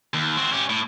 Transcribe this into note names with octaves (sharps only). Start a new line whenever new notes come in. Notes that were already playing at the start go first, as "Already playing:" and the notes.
D#2
C4 F#4
C#4 G4
A2